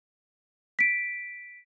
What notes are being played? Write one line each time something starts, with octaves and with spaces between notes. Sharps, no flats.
B6 D7